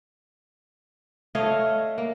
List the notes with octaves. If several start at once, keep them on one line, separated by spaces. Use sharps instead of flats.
A3 C#5 D#5 F5
A#3